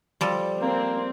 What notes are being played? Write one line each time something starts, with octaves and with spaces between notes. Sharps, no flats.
F3 G3 A4
A#3 C4